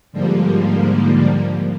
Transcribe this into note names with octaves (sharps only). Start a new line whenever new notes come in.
G#2 D3 F3 G3 A#3